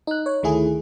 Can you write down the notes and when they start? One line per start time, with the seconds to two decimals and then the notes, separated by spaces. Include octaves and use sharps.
0.07 D#4 F#6
0.26 C#5
0.43 D2 D#3 A3 E4 G#4